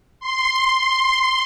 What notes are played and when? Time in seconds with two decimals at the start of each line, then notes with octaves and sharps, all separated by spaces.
0.20 C6